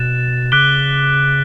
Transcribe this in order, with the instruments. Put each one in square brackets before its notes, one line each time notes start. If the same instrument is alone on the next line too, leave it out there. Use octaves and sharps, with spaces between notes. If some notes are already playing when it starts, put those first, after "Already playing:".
Already playing: [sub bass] B2 [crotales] F#6 A6 E7
[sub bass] C#3 [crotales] D6 F#6 B6 D7 G7